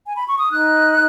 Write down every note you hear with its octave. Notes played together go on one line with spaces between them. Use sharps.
G#5
B5
C#6
D#6
D#4 F#6